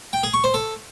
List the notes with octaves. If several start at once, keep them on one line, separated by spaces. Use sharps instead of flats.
G5
G#4
C#6
C5
A4